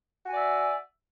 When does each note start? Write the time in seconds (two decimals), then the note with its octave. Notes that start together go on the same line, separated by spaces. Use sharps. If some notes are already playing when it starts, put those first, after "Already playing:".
0.25 F#4
0.28 G#5
0.32 D5
0.35 E5